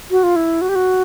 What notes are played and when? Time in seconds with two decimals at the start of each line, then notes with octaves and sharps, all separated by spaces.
0.11 F#4
0.23 F4
0.36 E4
0.61 F#4
0.69 G4
0.75 F#4